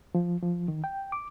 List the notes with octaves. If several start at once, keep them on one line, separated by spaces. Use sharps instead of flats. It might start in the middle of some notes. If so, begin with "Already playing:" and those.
F3
F3
D#3
G5
D6